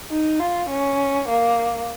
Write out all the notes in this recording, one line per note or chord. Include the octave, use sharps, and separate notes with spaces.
D#4
F4
C#4
A#3